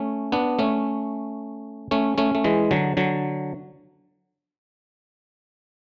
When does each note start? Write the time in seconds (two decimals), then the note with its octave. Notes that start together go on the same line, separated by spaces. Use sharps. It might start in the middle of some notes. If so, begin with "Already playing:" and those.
Already playing: A3 C#4
0.32 B3 D4
0.59 A3 C#4
1.91 A3 C#4
2.18 A3 C#4
2.35 A3
2.44 E3 G#3
2.71 D3 F#3
2.97 D3 F#3